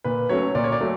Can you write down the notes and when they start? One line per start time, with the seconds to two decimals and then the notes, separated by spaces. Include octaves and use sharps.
0.04 A#2 B4
0.29 F#3 A3 C#4 C#5
0.55 A#2 D5
0.64 C#5
0.72 D5
0.81 F#3 A3